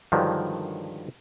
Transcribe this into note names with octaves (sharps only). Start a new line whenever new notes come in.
G2 D3 D#3 F3 F#3 G#3